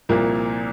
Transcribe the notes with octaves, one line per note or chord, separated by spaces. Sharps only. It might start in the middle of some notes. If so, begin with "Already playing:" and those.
C2 A#2 F3 A#3